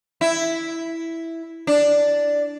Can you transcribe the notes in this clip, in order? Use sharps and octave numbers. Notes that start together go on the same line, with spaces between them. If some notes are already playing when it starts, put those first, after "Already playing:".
E4
D4